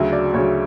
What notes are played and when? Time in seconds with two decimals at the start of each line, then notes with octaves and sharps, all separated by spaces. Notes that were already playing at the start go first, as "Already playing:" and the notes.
Already playing: D2 C#3 F#3 E5
0.13 D5
0.34 D2 C#3 F#3 C#5